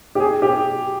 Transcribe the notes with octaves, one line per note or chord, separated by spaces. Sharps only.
G4
G#4
G4